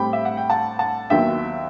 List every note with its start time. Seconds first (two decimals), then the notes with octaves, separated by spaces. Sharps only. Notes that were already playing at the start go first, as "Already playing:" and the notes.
Already playing: A2 G3 C4 G5 B5
0.13 E5
0.25 F#5
0.37 G5
0.50 F#5 A5
0.79 F#5 A5
1.10 D#2 D#3 F#3 B3 E5 G5